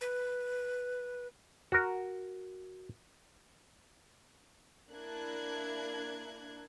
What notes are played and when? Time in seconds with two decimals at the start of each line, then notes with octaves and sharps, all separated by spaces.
0.01 B4
1.72 F#4 A#4
4.92 A#3 D4 E4 F#6 G#6